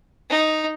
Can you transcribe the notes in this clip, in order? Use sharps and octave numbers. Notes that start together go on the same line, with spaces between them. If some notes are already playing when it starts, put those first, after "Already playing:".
D#4